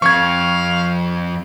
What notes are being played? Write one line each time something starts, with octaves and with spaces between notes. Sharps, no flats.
F2 F5 C#6 G#6